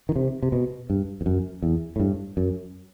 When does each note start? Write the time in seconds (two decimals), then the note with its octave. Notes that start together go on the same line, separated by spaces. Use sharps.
0.09 D#3
0.16 C3
0.43 C3
0.52 B2
0.90 G2
1.21 E2
1.26 F#2
1.62 E2
1.96 A2
2.00 G2
2.37 F#2